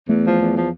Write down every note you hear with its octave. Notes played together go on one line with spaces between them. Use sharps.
E2 A3
F3
E2
F3